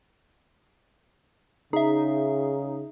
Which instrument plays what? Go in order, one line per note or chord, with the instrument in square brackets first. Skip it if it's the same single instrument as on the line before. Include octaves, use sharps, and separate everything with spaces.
[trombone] C#3 [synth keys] D#4 [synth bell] G#4 E5